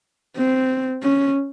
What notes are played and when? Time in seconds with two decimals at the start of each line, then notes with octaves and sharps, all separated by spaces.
0.36 C4
1.02 C#4